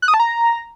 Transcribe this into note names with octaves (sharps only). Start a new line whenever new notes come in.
F#6
D#6
A5
A#5